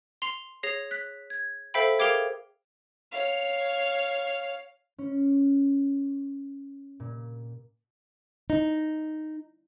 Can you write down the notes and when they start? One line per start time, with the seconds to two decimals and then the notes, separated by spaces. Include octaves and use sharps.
0.22 C6 C7 F7
0.63 G#4 C#5 A#6 C7
0.91 F#6 B6
1.30 G#6
1.74 A4 C5 E5 F5 G5 B5
1.99 G#4 A#4 F5 G5 D6 G#6
3.12 C#5 F5
4.98 C#4
7.00 A#2
8.50 D#4